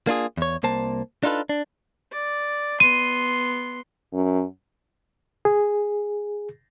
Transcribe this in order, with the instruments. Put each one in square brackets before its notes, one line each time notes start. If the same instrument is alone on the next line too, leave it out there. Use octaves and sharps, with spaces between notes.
[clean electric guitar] A#3 D4 F4 G#4
E2 C#5
C2 A#3 C5 A5
D4 D#4 F4 A4 B4
D4
[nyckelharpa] D5
[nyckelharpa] B3 C6 [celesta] D#7
[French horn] F#2
[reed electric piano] G#4